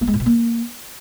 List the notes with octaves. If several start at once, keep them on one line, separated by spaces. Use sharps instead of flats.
A#3
G#3
A2
B2
A#3